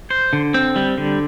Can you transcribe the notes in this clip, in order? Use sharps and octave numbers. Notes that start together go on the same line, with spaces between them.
C5
D3
C4
G3
D3